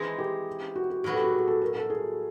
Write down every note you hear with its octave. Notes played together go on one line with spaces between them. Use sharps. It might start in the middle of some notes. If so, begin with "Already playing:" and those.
Already playing: E3 G#3 C4 D#4 G#4
G4
F#4
F#4
A2 F#3 B3 F#4
G4
F#4
G#4
A4
A#4
A4
G#4